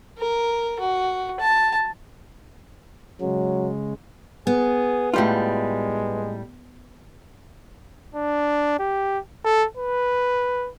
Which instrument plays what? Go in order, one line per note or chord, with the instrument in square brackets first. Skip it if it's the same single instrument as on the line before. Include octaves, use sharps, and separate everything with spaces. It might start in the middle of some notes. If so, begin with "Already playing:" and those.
[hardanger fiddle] A#4
F#4
A5
[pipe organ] C#3 G#3 [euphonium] F#3
[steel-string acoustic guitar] B3 [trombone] G#4
[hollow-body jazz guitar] A2 G3 F4 [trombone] G#3
[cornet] D4
G4
A4
B4